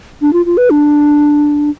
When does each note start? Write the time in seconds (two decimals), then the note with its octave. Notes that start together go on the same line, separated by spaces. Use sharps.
0.21 D4
0.33 F4
0.46 F4
0.57 B4
0.70 D4